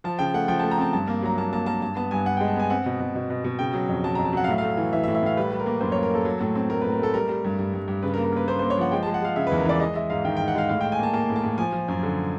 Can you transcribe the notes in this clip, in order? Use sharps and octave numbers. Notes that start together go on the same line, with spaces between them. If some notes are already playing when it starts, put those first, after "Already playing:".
F3 A5
C#3 G5
A3 F#5
F3 G5
A5
A3
A#5
C4 A5
G2 A5
A#3
F#3 A#5
A#3 A5
A#3 A5
A#3 A5
G2 A5
B3 A5
G2 G#5
G2 F#5
G5
G#3
A5
B3 G#5
C4 F#5
B2
B2
B2
B2
B2
C#3 G5
F#3
F2
F#3 A5
A#5
F2
A5
F#3 F#5
F5
A2 E5
A3 F5
E3
E3 E5
E5
A2
E5
A2 F5
G3 B4
G3
A#4
A#3
F#2 C5
C#5
A#3
A#4
A#3 A4
F#3
A2
C4
A3 A#4
A2 B4
A#4
A3 A4
G3 A#4
G3
G2
G2
G2
G2
C#3 B4
A#4
A#3
A#4
A#3 B4
A#3 C5
C5
A#3
C#5
F3 F#5
G#3 G5
A5
G#3
F#5
G#3 F5
C#3 E5
B4
E2
A#4
E3 D5
G#3 D#5
G#3 E5
G#2 F5
D#3 G5
G5
G#2
F#5
G#3 F5
A2 F5
G5
A2
G#5
A#3 A5
A#3 A5
A2
A5
A2
F3 G#5
F3
F#2
D3